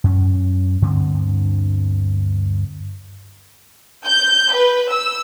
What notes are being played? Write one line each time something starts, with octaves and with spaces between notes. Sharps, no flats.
F#2 C#4
D2 G2 D3 C4
G6
B4
E6